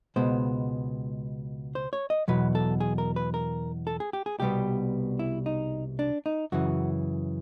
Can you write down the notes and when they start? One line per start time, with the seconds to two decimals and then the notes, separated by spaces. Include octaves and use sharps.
0.16 C#2 B2 G#3 B3 C5
1.75 C5
1.93 C#5
2.10 D#5
2.28 E2 B2 F#3 B4
2.55 A4
2.80 G#4
2.98 A#4
3.16 B4
3.34 A#4
3.87 A4
4.00 G#4
4.13 G4
4.26 G#4
4.40 C2 B2 G3 B3 G4
5.19 E4
5.46 D#4
5.99 D4
6.26 D#4
6.52 F#2 C#3 E3 F#4